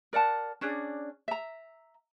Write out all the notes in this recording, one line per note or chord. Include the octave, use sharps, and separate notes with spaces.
A#4 D5 F#5 A5
C#4 D4 G#4 D5
E5 A#5